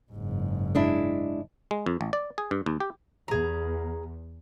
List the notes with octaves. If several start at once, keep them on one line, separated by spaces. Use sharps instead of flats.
F#1 G#2
G#3 D4 E4
G#3
F2
A1
D5
G#4
G2
D#2
G4
E2 G#4 A#5